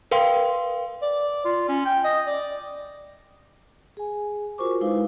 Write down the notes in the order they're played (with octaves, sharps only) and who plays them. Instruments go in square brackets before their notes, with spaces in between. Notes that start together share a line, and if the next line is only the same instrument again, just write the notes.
[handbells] A#4 B4 F5 G5 C6
[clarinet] D5
F4
C#4
G5
D#5
D5
[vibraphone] G#4 G#5
F4 F#4 A#4 C5 C#6 D6
G#3 D#4 E4 B4 F5